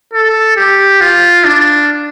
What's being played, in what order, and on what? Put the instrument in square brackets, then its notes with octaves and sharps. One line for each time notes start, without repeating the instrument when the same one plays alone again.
[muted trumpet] A4
G4
F4
D4